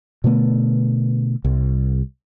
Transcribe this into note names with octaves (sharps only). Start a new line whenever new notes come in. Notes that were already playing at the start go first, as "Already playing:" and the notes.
B2 D3 A3 B3
C2